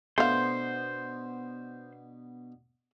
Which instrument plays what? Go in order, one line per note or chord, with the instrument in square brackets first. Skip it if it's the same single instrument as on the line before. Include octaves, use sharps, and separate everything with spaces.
[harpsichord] B2 B3 D4 [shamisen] A3 F5 [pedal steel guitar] C5